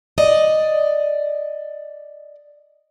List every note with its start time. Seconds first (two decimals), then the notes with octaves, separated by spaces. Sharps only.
0.18 D5 D#5